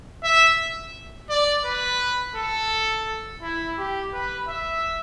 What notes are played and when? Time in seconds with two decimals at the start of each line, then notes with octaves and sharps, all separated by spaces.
0.24 E5
1.29 D5
1.65 B4
2.36 A4
3.42 E4
3.78 G4
4.14 B4
4.48 E5